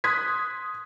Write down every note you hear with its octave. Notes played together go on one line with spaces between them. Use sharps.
C6 D#6 F#6 G#6 B6